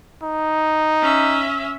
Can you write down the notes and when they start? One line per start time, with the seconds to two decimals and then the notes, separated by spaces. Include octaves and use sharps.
0.23 D#4
1.02 C#4 E5